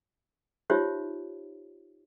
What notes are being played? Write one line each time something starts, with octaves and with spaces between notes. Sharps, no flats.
D#4 F4 G4 C5 C#5 E5